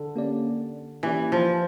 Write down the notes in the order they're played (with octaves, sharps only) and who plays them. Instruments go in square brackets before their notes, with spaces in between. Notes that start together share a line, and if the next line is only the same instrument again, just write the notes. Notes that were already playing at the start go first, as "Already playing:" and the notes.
Already playing: [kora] D3
[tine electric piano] A#3 C#4 G4 D5
[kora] E3 [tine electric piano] A#3 C#4 G4 D5
[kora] F3